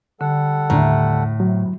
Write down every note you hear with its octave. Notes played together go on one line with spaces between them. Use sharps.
D3 G3 A4 F#5
D#2 A2 D3 A#5
C3 F#3